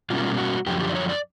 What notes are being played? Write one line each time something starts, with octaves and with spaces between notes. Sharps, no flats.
B2 G3 A#3 C#4 F4
F#4
F#2 D3 F3 G4
G4
D5
C#5
D5